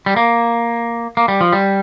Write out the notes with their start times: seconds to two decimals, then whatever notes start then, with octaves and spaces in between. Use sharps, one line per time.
0.06 G3
0.16 A#3
1.17 A#3
1.28 G3
1.41 F3
1.53 G3